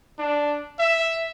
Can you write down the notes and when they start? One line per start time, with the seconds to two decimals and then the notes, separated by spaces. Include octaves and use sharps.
0.18 D4
0.79 E5